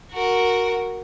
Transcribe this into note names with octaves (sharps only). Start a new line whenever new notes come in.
F#4 A#4